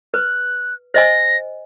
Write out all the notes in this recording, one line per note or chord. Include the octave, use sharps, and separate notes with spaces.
B4 F#6
C5 D#5 G#5 A#6